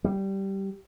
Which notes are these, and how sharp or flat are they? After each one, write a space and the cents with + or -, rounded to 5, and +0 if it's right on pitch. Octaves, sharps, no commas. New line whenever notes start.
G3 -10